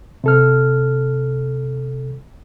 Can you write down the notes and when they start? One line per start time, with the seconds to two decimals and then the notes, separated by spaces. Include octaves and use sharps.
0.24 C3 A4 F6